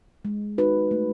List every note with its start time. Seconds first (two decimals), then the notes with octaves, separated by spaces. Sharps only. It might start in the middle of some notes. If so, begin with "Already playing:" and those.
0.25 G#3
0.58 D#4 F#4 B4
0.91 A3